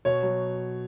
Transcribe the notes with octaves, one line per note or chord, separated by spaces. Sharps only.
B2 C#5
F#3